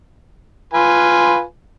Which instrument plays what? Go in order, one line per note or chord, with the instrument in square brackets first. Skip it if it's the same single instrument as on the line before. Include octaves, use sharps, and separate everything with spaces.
[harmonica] F4 B4 G#5